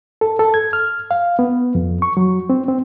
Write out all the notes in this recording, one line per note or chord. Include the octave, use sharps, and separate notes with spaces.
A4
A4
G#6
F6
F5
B3
F2
C#6
F#3
C4
C4